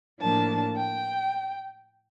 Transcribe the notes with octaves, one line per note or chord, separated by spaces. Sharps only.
A2 F3 A#3 D4 A5
G5